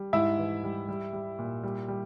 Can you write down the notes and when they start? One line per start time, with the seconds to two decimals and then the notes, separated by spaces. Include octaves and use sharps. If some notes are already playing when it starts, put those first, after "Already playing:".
Already playing: G3
0.13 G#2 E4 E5
0.39 E3
0.63 G3
0.88 G3
1.13 G3
1.39 A#2
1.63 G3
1.88 G3